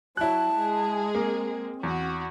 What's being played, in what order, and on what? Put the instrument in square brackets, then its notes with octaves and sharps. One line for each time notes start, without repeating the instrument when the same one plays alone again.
[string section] F#3 [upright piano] E4 F#6 [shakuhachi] A5
[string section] G#3 G#4
[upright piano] A#3 [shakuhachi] C4
[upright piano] E2 [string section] F#4